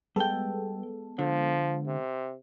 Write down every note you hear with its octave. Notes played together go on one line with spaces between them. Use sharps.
G3 G#3 B3 A4 G5
D3 F3
C3